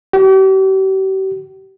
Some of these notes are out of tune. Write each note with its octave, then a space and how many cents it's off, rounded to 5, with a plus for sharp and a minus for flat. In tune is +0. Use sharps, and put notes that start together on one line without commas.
G4 -40